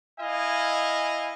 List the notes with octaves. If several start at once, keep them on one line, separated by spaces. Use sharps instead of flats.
E4 D#5 F5 G#5